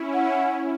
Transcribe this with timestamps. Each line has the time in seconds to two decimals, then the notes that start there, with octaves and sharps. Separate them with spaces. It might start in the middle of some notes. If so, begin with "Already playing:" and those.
Already playing: C#4 E4
0.14 F#5